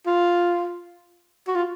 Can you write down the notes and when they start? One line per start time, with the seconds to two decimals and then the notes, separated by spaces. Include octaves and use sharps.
0.06 F4
1.48 F#4
1.55 F4